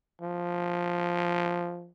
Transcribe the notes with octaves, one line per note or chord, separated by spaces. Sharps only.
F3